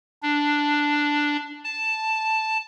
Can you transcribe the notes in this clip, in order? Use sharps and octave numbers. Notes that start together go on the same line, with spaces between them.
D4
A5